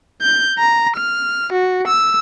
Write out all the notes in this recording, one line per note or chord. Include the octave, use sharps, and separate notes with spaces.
G6
A#5
F6
F#4
E6